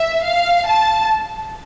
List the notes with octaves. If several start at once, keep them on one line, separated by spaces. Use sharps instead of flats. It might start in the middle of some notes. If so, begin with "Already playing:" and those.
Already playing: E5
F5
A5